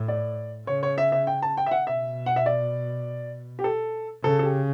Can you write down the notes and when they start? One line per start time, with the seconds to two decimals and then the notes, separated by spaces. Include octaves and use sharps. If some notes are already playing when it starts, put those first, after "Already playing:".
Already playing: A2
0.08 D5
0.67 C#3 C#5
0.83 C#5
0.98 E5
1.12 E5
1.27 G5
1.42 A5
1.57 G5
1.66 E5
1.71 F#5
1.87 B2 E5
2.26 F#5
2.36 E5
2.46 D5
3.59 G4
3.64 A4
4.24 C#3 A4
4.39 A4
4.43 G4